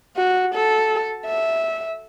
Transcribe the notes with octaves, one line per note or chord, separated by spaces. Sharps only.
F#4
A4
E5